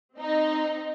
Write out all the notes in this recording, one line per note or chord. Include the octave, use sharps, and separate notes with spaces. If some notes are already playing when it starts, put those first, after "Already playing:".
C4 D#4